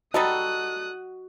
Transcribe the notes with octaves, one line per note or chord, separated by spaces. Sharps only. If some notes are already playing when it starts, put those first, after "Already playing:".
G3 D#4 F#4 A4 D#5 D#6 F#6